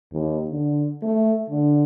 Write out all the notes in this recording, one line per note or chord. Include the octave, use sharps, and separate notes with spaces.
D#2
D3
A3
D3